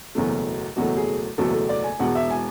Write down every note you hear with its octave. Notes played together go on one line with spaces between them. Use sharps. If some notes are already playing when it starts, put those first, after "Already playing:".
F#1 E2 B2 F#3 A3
F#1 E2 B2 F#3 A3 F#4
G#4
F#1 E2 B2 F#3 A3 A4
A4
D5
G#5
E1 E2 B2 G#3 F#5
E5
G#5